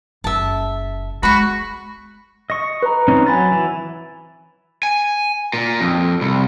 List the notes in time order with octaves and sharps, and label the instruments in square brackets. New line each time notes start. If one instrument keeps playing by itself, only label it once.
[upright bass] F#1 [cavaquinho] E5 A5
[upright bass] G#3 [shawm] F#4 [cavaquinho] B5 C#6
[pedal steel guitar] D#5 C#6 [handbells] A#6
[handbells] B4 A#5
[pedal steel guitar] C4 C#4 D#4
[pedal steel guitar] F#3 [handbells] G#5 B5 A6
[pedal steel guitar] E3
[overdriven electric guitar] G#5
A#2
F2
C2